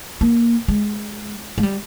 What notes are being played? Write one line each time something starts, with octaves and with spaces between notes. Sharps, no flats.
A#3
G#3
G#3
G3